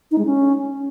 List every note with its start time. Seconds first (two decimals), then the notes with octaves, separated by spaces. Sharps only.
0.11 D#4
0.18 G#3
0.25 C#4